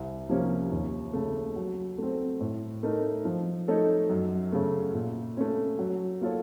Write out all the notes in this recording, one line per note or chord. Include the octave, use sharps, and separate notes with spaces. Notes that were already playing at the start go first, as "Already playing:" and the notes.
Already playing: C2
C3 F3 A#3 C#4
D#2
C#3 A3
F#3
A3 C4
A2
A3 D#4 A#4
F3
A3 D#4 A4 C#5
F#2
C#3 A3
A#2
A3 C#4
F#3
A#3 F4 A4 C#5